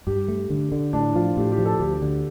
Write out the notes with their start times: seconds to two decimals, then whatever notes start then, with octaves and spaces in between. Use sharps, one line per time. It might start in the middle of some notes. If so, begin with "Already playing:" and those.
0.07 G2 G4
0.28 A3
0.50 D3
0.72 D3
0.93 A2 D4
1.15 F3 F4
1.37 A2 G4
1.52 G4
1.58 F3
1.65 A4
1.79 D2 G4
2.02 D3